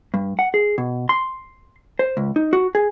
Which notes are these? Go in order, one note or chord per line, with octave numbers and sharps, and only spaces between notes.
G2
F#5
G#4
B2
C6
C5
C#2
D#4
F#4
G#4